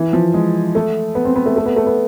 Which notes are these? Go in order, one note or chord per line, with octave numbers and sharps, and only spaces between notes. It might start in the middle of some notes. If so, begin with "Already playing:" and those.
Already playing: E3
F3
G#3
A3
B3
C4
B3
A3
A3
B3
A3
B3